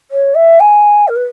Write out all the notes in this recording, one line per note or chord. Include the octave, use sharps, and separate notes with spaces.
C#5
E5
G#5
A#4
B4